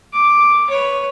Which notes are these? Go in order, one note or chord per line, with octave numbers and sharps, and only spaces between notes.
D6
B4 C#5